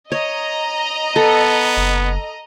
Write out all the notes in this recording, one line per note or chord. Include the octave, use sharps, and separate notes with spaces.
C#5 D#5 A#5
B3 A4
F#1